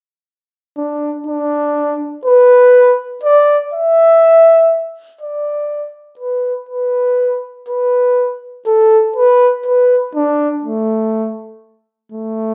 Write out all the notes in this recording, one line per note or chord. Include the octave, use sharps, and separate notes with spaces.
D4
D4
B4
D5
E5
D5
B4
B4
B4
A4
B4
B4
D4
A3
A3